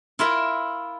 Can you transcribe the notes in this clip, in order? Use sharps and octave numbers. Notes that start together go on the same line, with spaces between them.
E4 F4 A#4 E5